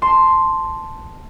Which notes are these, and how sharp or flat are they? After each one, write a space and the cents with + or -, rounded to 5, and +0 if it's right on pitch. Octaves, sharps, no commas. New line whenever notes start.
A5 +0 C6 +0